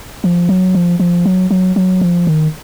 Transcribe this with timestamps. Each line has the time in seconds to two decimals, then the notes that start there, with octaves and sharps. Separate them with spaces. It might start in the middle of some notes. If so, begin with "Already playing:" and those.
0.24 F3
0.49 F#3
0.75 F3
1.00 F3
1.26 F#3
1.51 F#3
1.76 F#3
2.01 F3
2.27 D#3